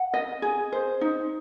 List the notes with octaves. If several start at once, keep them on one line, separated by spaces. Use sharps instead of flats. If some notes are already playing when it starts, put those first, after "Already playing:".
Already playing: F#5
D#5
G#4
C5
D#4